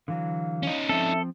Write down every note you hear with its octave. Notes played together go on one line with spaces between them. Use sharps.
D3 E3 F#3 F5
C#4 D#4
F3 C4 A4 E5